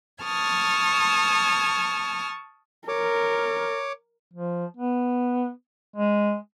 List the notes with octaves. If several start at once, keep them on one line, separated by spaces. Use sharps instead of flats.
A5 C#6 D#6 F6 G#6
A#4 C#5 D6
F3
B3
G#3